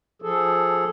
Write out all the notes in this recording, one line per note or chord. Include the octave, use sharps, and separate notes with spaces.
F3 G#4 A4